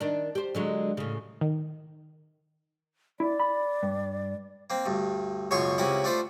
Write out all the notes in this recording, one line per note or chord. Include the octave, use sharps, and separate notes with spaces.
D#3 D4
G4 C5
D3 F#3 G#3
A2 C#3
D#3
E4 D5
B5
G2
A#3 C4
D2 G2
C#2 F#2 B2 C#5 C6 C#6
C#2 C3 C#4 E4 F#5
A3 D4 F4 C5 E5